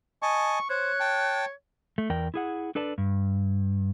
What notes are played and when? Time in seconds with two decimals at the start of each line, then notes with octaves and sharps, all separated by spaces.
0.22 D#5 G#5 A5 C#6
0.70 C5 C#5 F#6
1.00 G5 A5
1.98 A3
2.10 E2 A#4 D5 G5
2.34 E4 G#4 F#5
2.75 D4 A4 B4 D5 A5
2.98 G2